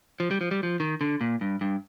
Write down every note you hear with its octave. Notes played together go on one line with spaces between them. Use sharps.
F3
G3
F3
G3
F3
D#3
D3
A#2
G2
G2